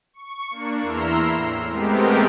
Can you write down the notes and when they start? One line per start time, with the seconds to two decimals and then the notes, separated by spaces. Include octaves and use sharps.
0.13 C#6
0.50 A#3 D4
0.82 E2 E4 A#5 C6 E6 F6
1.33 A2 C7
1.67 G#3 A3 B3 C4 G4 A#4